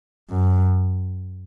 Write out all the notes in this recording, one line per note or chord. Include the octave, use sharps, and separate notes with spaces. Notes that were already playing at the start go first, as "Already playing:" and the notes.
F#2